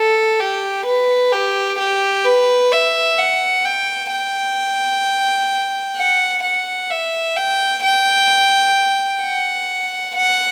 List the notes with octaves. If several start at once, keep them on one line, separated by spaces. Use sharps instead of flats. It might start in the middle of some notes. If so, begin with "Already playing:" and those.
Already playing: A4
G4
B4
G4
G4
B4
E5
F#5
G5
G5
F#5
F#5
E5
G5
G5
F#5
F#5